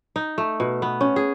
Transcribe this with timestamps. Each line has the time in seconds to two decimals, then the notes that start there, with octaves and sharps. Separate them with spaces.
0.16 D#4
0.38 A3
0.60 B2
0.82 B3
1.01 C#4
1.16 G#4